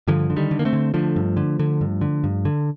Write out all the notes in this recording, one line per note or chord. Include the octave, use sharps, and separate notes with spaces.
G2 D3 F3
D3
D#3 G3
D3
A#3
A3 C4
D3
D3 F3 A3
G2
D3
D3
G2
D3
G2
D3